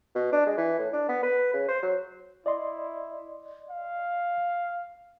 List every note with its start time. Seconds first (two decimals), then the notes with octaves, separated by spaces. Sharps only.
0.15 B2
0.33 D4
0.46 G#3
0.57 E3
0.78 A2
0.93 D4
1.08 B3
1.23 B4
1.53 C#3
1.68 C5
1.82 F#3
2.46 E4 D5 D#5 C6
3.70 F5